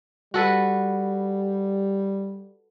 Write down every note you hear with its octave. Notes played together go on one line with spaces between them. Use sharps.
G3 F#4 A4 B4